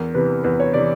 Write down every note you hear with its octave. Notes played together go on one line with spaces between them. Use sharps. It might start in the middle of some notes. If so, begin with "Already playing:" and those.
Already playing: E2 A#4
C3 E3 B4
E2 B4
C#5
C3 E3 D5